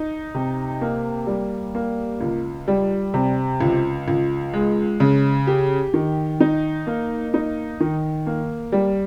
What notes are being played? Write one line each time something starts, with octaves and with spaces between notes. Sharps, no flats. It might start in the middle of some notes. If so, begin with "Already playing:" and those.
Already playing: D#4
C3
A#3
G3
A#3
C#2
G3
C3
C#2
C#2
G#3
C#3
G4
D#3
D#4
A#3
D#4
D#3
A#3
G3